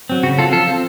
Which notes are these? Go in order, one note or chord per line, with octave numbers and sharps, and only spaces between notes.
F#3 C4
C#3 F#4
F#3 C4 F4 A4
F3 F4 A4
C4